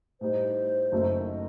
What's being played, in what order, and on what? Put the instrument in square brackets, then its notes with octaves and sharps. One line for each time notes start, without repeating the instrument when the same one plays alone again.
[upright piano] A2 G3 D#4 [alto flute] C5
[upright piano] F#1 F#2 F#3 A3 D#4
[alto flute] D#5